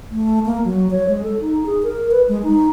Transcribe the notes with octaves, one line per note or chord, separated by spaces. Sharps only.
A3
A#3
F#3
C#5
G#3
A4
D#4
G#4
A#4
B4
G#3
D#4